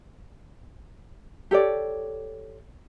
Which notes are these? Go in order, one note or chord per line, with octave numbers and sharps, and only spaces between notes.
G4 A4 C#5 D5